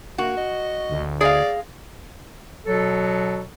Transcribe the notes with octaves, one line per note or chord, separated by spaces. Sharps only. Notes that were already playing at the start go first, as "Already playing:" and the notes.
A#3 F#4
D#5
D2
G#4 D5 D#5 F5
B2 F#3 A4